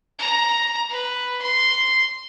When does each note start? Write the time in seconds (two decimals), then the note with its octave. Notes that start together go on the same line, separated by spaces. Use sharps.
0.19 A#5
0.90 B4
1.41 C6